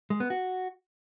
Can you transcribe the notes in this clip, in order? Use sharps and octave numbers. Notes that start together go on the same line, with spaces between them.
G#3
B3
F#4